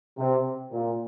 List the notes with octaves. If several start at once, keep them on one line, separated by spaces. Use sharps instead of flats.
C3
A#2